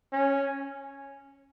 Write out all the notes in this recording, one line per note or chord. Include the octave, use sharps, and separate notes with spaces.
C#4